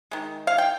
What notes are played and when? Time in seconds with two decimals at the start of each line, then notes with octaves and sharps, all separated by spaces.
0.11 D#3 G#3
0.47 F5
0.58 G5